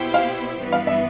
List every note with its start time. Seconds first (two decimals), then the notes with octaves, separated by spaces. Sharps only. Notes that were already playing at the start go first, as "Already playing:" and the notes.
Already playing: B2 B3 E4 G4 C5
0.14 F5
0.58 G2 E3 B3
0.72 F5
0.87 E5